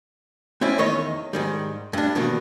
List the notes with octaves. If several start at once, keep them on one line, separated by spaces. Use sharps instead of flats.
C4 C#4 E4 D5
E2 D#3 C#5 D#5
G#2 D#3 G3
G2 D4
B2 D#3 E3 G3 A#3